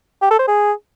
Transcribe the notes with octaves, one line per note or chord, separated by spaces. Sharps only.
G4
A4
C5
G#4